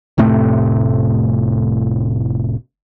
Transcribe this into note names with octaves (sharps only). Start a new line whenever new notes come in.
F1 A2 C3 A3